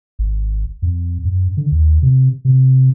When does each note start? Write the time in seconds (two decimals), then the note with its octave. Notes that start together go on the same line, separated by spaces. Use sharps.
0.19 G#1
0.82 F2
1.25 F#2
1.57 D3
1.72 D#2
2.02 C3
2.45 C3